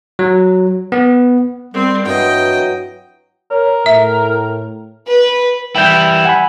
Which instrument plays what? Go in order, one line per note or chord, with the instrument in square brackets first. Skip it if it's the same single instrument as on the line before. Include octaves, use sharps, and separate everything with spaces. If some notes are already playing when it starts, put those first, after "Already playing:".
[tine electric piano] F#3
B3
[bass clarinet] G3 [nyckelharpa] C4
[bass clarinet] G2 [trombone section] E3 F#3 F#4 [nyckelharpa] D#5 G5
[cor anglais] A#4 [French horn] C#5
[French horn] A2 [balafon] E5
[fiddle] B4
[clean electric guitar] E3 G3 E4 [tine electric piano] G5 G6
[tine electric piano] F#5 G#5 B5